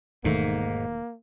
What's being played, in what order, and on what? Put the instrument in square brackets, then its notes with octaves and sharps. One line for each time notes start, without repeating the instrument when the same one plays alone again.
[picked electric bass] E1 D#3 A3 [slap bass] G#2 [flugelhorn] A#3